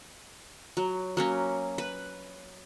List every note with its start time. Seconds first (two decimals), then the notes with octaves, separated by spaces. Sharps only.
0.77 F#3
1.17 F#3 A#3 C#4
1.78 B4